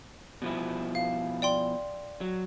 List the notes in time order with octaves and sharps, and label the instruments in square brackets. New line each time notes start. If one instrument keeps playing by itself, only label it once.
[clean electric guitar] B2 F3 E4
[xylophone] F5
D5 G5 C6
[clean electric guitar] F#3